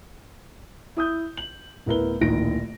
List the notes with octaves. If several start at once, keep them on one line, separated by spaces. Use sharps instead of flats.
E4 D#6 G6
F#7
D1 B3 E4 A#4 B4 G7
D1 A#1 D#3 A#6 D7